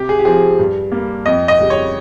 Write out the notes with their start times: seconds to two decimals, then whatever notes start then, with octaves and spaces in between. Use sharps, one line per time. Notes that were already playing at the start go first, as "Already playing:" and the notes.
Already playing: C3 G4
0.09 G#4
0.19 G4
0.25 F3 C4 G#4
0.59 G2
0.92 G3 A#3
1.26 F2 D#5
1.48 D#5
1.59 C#3 G3
1.70 C#5